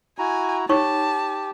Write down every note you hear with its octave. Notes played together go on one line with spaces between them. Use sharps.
E4 F#4 G#5 A#5
D#4 G4 C#5 A5 C#6